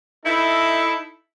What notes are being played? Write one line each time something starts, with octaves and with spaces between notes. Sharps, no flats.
D#4 E4 A4